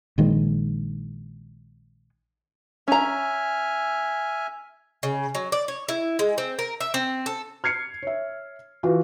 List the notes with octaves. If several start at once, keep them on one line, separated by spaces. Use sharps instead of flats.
A#1 D#3 G#3
C#4 E5 G#5 A#5 F6
C#3
F#3
D5
C#5
E4
G#3
C4
A#4
E5
C4
A4
F6 G#6 C7 C#7
C#5 E5
E3 F4 F#4